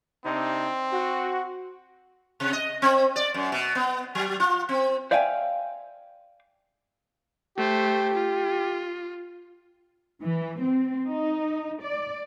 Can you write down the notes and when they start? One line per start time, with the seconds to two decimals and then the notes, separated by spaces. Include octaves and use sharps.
0.25 C3 C4 D4 D#4
0.92 F#4
2.40 C3
2.53 D#5
2.82 C4
3.16 D5
3.34 F#2
3.52 B2
3.75 B3
4.15 F#3
4.40 F4
4.69 C4
5.11 C5 D5 E5 F5 G5 G#5
7.57 A3 G4 C5
8.14 F4
10.22 E3
10.60 C4
11.08 D#4
11.82 D5